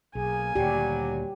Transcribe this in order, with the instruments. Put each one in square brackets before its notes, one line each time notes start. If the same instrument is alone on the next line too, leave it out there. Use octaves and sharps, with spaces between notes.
[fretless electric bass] B1 [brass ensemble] A#3 G#4 [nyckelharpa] G#5
[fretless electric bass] D2 A#2 D#3 [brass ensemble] F#3 G3 [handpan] G4